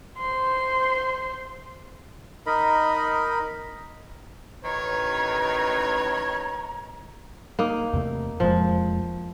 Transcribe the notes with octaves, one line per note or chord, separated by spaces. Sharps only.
C5 C6
D#4 A#4 D#5 B5
A1 D#3 B4 C#5 A#5
A#3 D#4
E2 C3 A3
E1 F2 F3 G#3